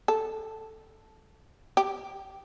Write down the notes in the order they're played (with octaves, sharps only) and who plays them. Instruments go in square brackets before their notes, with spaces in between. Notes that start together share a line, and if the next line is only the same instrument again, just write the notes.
[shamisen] A4
G4